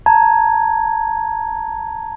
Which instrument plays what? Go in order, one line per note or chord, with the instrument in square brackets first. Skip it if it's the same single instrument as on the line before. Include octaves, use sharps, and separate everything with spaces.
[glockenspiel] A5 A#5 G#6